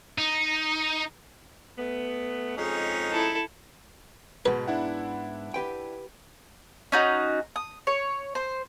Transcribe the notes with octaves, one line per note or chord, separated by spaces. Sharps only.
D#4
A3 B3
F2 G#3 C#4 D#4 G#4
E4 A4
G#2 B2 B3 B4
D4 E4 F#5
G4 B4 G5
C#4 D#4 F#4
D#6
C#5
C5